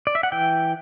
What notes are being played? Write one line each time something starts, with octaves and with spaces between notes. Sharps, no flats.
D5
E5
F#5
E3 G5